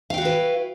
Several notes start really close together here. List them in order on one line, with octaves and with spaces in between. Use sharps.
F5 G5 F#4 E4 B4